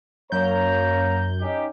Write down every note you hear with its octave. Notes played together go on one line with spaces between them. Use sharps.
F#2 A#3 C#5 A#5 G6
C#4 D#4 G4